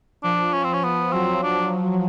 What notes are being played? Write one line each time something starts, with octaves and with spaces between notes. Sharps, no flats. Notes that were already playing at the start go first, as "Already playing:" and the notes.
F3 D4
C#4
C4
F3 C#4
B3
F#3 C4
D4